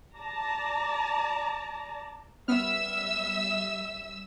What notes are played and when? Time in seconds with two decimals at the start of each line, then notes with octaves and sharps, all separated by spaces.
0.17 D5 A5 A#5
2.48 G3 B3 E5 E6 F6